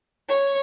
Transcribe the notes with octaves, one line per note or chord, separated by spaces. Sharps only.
C#5